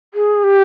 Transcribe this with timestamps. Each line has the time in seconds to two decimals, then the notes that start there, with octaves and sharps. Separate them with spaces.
0.14 G#4
0.44 G4